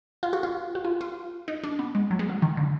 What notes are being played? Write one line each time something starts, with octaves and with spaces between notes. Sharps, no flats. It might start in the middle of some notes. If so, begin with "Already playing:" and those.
F4
F#4
F4
F#4
F4
F4
D#4
D4
B3
G#3
F#3
G#3
F#3
D#3
D3